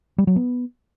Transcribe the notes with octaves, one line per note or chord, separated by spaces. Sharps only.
G3
F#3
B3